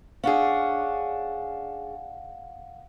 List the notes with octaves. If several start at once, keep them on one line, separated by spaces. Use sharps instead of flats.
C#4 D4 G#4 F5 F#5